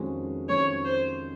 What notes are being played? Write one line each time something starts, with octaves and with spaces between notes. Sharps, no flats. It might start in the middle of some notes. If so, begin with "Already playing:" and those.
Already playing: F2 D#3 G#3 C#4 F#4
F2 D#3 G#3 C#4 F#4 C#5
C5